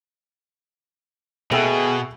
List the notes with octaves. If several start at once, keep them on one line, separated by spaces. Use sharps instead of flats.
B2 B3 G#4 A4 B4 E5 G5 E6